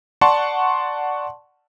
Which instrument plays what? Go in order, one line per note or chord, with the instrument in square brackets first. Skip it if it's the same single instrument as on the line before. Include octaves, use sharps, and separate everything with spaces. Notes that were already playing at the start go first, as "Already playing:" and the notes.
[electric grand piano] D5 F#5 A5 C6 C#6